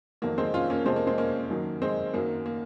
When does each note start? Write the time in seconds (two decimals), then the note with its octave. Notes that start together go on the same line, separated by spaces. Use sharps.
0.22 F2 D#3 F#3 A#3
0.38 G#3 C4
0.54 C#4 F4
0.70 A#3 C#4
0.86 F2 C3 F3 G#3 C4
0.96 A#3
1.07 G#3 C4
1.18 A#3 C#4
1.50 F#2 D#3 F#3
1.82 G#3 C4
2.14 F#2 D#3 F#3 A#3
2.46 A#3